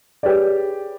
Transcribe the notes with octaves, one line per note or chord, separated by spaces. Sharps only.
G4 G#4 B4 C#5 D5